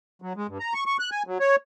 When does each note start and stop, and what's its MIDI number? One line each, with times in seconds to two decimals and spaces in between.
0.22 0.33 54
0.36 0.47 56
0.48 0.58 43
0.60 0.74 82
0.74 0.84 85
0.86 0.97 85
0.99 1.10 90
1.11 1.23 80
1.27 1.38 54
1.40 1.56 73